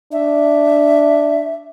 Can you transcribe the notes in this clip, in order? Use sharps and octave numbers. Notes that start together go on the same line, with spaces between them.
D4 E5